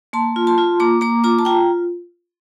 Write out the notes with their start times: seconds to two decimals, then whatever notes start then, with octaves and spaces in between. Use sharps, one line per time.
0.13 A#3 A5 C6
0.36 F4
0.47 A5 C6
0.58 F4
0.80 A#3 A#5 D6
1.01 A#3 A#5 D6
1.24 F4 A#5 D6
1.39 A5
1.45 F4 G5 A#5